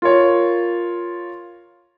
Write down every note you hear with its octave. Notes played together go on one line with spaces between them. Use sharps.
F4 A#4 C#5